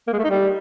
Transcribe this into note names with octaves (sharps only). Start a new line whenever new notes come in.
A#3
G#3
A3
D#4
G3